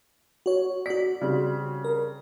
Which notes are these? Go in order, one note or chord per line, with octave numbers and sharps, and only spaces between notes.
F#4 C#5
F#4 D5 B6
C#3 G3 C4
A#4